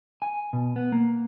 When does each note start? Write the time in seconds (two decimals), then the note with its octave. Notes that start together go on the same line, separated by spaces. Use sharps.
0.22 G#5
0.53 B2
0.76 B3
0.92 A#3